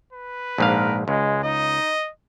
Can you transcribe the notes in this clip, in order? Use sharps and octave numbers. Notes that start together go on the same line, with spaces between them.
B4
A#1 G#2 A#4 F5
C#2 G#3
D#4 D#5